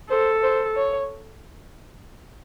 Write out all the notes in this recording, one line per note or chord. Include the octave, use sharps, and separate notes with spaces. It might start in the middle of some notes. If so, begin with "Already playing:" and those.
A4 C5
C5
C#5